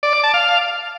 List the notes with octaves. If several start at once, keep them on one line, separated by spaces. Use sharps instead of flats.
D5
D6
A5
F5